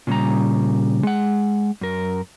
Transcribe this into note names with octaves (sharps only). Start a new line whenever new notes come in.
A#2 C#3 G3 A#5
G#3 F#5
F#2 A#4